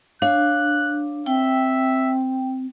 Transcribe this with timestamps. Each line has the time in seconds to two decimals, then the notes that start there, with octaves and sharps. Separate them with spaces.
0.22 D4 C#5 F5 F#6
1.26 C4 E5 G5